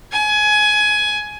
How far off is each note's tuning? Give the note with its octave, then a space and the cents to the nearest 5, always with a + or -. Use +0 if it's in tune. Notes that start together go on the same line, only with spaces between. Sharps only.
G#5 +20